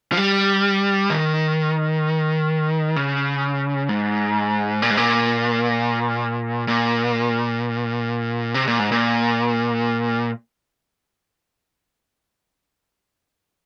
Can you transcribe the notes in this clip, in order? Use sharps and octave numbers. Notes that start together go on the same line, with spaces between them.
F3
G3
D#3
C#3
G#2
A#2
G#2
A#2
A#2
C3
A#2
G#2
A#2